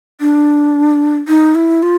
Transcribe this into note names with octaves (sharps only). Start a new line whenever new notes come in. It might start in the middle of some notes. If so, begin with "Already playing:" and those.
D4
D#4
E4
F4